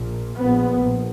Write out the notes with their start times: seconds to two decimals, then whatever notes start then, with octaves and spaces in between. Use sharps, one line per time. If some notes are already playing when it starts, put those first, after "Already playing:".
Already playing: A#1 A#2
0.37 A#1 A#2 B3
0.80 A#1